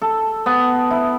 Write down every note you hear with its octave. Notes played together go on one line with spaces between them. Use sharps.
A4
B3
E4